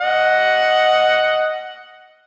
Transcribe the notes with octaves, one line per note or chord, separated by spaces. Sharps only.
D#5 F#5